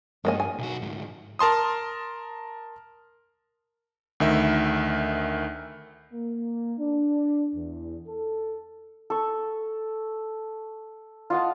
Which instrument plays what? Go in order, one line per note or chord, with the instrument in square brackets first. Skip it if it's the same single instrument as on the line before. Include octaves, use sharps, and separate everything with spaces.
[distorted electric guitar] G2 [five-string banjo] G#3 A#3 G#5
[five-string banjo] G#5
[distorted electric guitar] B1 F#4
D2 G#2
[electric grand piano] A#4 A5 C6 D#6
D2 D#3 E5
[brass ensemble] A#3
D4
E2
A4
[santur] A4 C#6
F4 D#5 F#5 A5